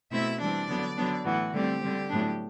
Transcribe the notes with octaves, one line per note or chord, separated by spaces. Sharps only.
B2 A3 C4 E4 E5
E3 G3 C4 D4 D5
D3 F#3 B3 D4
D3 F#3 B3 D4
A2 E3 B3 F#4
D3 G3 A3 C4 G4
D3 G3 C4
A2 F#3 B3 D4